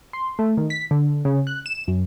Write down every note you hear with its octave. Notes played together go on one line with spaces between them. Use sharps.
C6
A3
D#3
B6
D3
C#3
F#6
E7
F#2